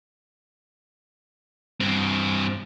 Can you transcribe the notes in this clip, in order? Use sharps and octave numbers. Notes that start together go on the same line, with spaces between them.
G2 C4